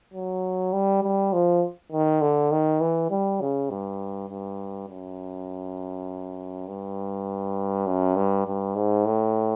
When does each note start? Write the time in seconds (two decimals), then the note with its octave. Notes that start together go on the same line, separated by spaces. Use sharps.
0.14 F#3
0.73 G3
1.03 G3
1.33 F3
1.92 D#3
2.22 D3
2.52 D#3
2.81 E3
3.11 G3
3.41 C#3
3.70 G2
4.30 G2
4.89 F#2
6.68 G2
7.87 F#2
8.16 G2
8.46 G2
8.76 G#2
9.05 A2